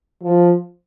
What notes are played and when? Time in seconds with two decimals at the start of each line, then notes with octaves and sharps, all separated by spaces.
0.23 F3